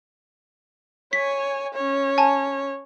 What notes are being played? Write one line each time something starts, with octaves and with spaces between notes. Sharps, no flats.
C#5 G#5 B6
C#4 C#5
G#5 A5